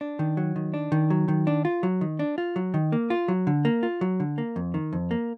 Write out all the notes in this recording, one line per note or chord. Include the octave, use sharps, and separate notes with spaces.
D4
D#3
F#3
D#3
D4
D#3
F#3
D#3
D4
F4
F#3
D#3
D4
F4
F#3
D#3
A#3
F4
F#3
D3
A#3
F4
F#3
D3
A#3
F2
D#3
F2
A#3